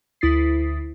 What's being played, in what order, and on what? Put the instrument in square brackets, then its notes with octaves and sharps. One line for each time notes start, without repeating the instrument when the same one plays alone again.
[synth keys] D2 E4 D#6 A6 B6 C7